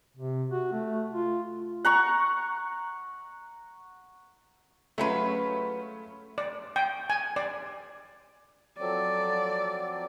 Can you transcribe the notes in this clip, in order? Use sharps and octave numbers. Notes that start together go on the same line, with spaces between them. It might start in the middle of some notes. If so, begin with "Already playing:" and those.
C3
F#4
A3
F4
F#5 A#5 C#6
F#3 G#3 A3 C#4 F4 B4
D5
G5
G#5
D5
F3 F#3 C4 A4 D5